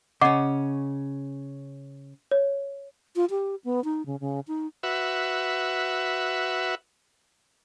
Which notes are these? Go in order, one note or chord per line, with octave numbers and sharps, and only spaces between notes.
C#3 C#4 D#5 F#5 D6
C#5
F4
G4
B3
D#4
C#3
C#3
D#4
F#4 B4 E5